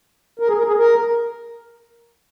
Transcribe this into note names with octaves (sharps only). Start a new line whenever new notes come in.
A#4
G#4
A#4
G#4
A#4